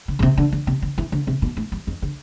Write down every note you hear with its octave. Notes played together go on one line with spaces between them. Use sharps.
D3
D3
C3
D3
D3
C3
D3
E3
D3
C3
B2
A2
G2
F2
D3